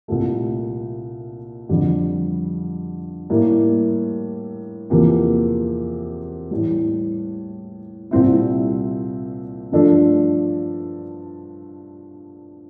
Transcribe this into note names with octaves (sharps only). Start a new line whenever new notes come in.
C2 A#2 A3
F2 D3 G3
A2 G3 A#3 E4
E2 C3 F3 A#3
A2 E3 G3
C2 A#2 G3 C4 E4
G2 F3 A3 D4 A4